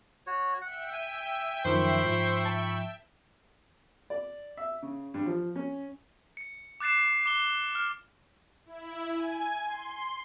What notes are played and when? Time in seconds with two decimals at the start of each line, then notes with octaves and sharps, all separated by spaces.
0.27 F#4 C#5
0.61 E5 F#5 G5
0.93 G#5
1.65 F#2 D#3 F3 C5 B5 C#6
2.05 G#2 F3
2.46 A5
4.10 D5
4.57 E5
4.82 C#3
5.14 G2
5.26 F3
5.56 C#4
6.37 C#7
6.80 D6 F#6 A6 C7 E7
7.26 D6 G7
7.75 F6
8.66 E4
9.12 G#5
9.66 C6